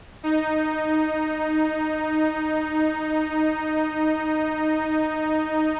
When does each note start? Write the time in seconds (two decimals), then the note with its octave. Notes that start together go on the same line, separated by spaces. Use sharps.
0.23 D#4